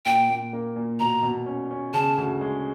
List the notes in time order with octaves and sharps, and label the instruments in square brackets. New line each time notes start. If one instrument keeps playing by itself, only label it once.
[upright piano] A#2 [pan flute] G5
[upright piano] A#2
A#3
A#2
[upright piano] B2 [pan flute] A#5
[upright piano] B2
C#4
C#4
[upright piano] C#3 [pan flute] A5
[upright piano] D2
G#3